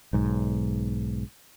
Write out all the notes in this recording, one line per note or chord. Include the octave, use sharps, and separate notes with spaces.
B1 G#2